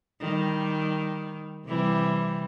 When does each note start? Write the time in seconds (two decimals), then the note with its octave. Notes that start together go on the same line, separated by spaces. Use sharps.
0.20 D#3 G3
1.65 C3 E3 G3